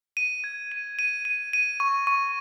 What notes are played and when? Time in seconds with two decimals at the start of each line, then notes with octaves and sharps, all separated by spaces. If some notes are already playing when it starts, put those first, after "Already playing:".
0.17 D#7
0.44 G#6
0.72 D#7
0.99 D#7
1.25 D#7
1.53 D#7
1.80 C#6
2.07 C#6